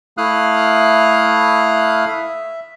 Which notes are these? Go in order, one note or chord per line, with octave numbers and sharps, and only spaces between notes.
A3 E4 F5 D#6 F6 F#6
E5